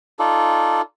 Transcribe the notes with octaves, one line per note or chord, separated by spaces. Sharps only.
D#4 F4 A4 D5